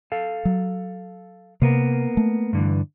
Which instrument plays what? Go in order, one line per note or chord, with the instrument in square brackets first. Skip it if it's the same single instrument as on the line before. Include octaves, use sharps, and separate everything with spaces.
[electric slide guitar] A4 F5
[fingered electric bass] F#3
[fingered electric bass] C3 [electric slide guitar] A#3 B3 A#4
[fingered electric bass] A3
[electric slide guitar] G2 D3 E3